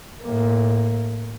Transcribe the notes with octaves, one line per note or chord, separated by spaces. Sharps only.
A2 A#3